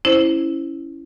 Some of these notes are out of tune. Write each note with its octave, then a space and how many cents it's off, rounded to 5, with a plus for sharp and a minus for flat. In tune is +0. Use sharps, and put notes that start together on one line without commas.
C#4 +0 E4 +0 C5 +5